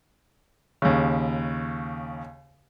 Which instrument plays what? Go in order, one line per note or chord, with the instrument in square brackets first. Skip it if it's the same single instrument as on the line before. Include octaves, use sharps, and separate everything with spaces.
[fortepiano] D#2 C#3